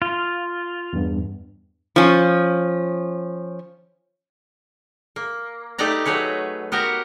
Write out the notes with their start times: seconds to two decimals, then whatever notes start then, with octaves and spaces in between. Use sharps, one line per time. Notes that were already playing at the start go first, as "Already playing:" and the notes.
0.02 F4
0.93 E2 G2
1.96 F3 C#4
5.16 A#3
5.78 A3 D#4 G4 B4 D5 A#5
6.05 F#3 A3 G#4 B4 C#5
6.72 B3 F#4 G4 A#4